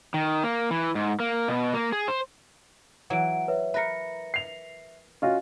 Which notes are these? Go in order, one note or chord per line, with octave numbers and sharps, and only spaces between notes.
D#3
A#3
E3
G#2
A#3
B2
A#3
G#4
C5
E3 F#3 F#5 D7
B4 C#5 E5
A#4 B4 E5 A#6 C#7
C7 F7
C#4 F4 F#4 D#5